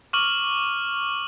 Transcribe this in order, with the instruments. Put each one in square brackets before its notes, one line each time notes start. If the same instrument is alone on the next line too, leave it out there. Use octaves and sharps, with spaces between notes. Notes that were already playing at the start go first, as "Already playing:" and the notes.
[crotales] C#6 D6 F6 D#7 F#7